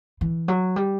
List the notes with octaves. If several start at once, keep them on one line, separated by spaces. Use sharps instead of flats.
E3
F#3
G3